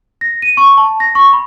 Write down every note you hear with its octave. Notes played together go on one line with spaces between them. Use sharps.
A#6
D#7
C#6
A5
A#6
C#6
B5